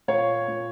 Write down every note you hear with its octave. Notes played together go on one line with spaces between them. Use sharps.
A#2 C#5 F5
A#2